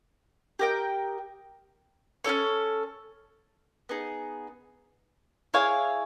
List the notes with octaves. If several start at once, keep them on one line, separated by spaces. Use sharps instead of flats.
G4 A#4 D#5 G5
C#4 E4 A4 C#5
B3 D#4 G#4
E4 G#4 C#5 F5